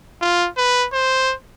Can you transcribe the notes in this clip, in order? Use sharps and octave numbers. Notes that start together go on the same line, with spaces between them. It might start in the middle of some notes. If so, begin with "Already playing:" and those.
F4
B4
C5